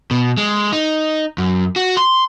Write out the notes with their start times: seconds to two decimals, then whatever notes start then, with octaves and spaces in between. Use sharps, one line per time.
0.11 B2
0.38 G#3
0.73 D#4
1.38 F#2
1.76 F#4
1.97 C6